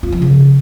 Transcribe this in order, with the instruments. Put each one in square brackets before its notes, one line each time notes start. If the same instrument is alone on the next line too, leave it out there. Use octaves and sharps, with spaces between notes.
[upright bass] F4
F3
C#3